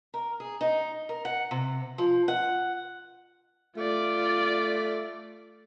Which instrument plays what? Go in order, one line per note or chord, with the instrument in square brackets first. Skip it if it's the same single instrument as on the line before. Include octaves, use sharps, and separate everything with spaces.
[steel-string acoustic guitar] A#4
G#4
D#4
A#4
F#5
C3
F3
F#5
[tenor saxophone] A3 [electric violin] F4 D5